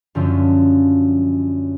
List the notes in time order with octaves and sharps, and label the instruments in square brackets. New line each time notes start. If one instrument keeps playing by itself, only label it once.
[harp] F#2 D3 F3 A3 C#4